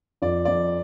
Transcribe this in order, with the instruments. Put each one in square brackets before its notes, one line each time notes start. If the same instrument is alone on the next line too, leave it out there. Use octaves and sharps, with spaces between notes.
[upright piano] F2 [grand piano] D5
[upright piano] F2 [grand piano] D5